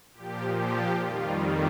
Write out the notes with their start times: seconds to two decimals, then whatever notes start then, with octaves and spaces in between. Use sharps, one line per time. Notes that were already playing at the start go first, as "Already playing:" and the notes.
0.14 A#2 F3 G4
0.58 G4
1.01 F2 D#3 G3 F4